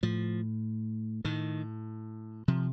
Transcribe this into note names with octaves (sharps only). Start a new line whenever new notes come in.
A2 F3
A2 D#3
C3 F3